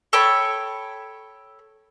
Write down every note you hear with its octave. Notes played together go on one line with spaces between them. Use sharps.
A4 C#5 G5 B5